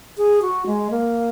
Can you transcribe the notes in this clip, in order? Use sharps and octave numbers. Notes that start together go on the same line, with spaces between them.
G#4
F#4
G#3
A#3